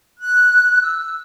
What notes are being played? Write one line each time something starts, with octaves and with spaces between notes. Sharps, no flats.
F#6
E6